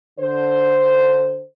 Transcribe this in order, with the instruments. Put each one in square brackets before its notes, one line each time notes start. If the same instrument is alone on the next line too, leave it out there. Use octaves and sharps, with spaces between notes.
[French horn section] D3 C5